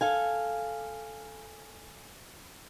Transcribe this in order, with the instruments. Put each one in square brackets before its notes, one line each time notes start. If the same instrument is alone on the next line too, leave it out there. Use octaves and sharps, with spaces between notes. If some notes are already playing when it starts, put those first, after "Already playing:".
[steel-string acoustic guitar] A4 F5 G#5